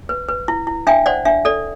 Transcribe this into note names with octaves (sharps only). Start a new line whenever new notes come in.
B4
B4
E4
E4
D4 E5 G5
C5 D5 F#5
D4 E5
A4 D5